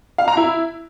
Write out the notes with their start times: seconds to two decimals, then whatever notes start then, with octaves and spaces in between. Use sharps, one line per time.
0.18 F5
0.28 A#5
0.37 E4